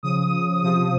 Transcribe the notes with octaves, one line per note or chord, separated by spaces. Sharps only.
C#3 F3 D#6
C3 F3 D#6